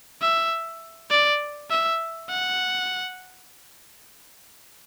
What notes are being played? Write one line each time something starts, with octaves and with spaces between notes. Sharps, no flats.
E5
D5
E5
F#5